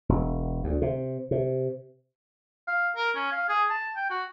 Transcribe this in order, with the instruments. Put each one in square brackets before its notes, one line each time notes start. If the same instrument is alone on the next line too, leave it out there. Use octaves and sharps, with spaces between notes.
[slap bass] E1
D2
C3
C3
[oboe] F5
A#4
C#4
F5
G#4
A5
G5
F#4